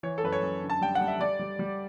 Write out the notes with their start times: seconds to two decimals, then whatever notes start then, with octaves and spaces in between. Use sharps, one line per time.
0.03 E3 C#5
0.18 A4
0.24 F#2 B4
0.32 C#5
0.43 F#2
0.62 D3
0.70 A5
0.81 G3 G5
0.95 F#5
1.01 G3
1.08 E5
1.20 G3 D5
1.39 G3
1.59 G3